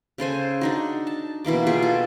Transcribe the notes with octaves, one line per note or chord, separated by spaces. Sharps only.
C#3 A4 C5 G#5
D4 D#4 F#4
A5
B2 E3 A#3 D6
F4 G4 G#4
A4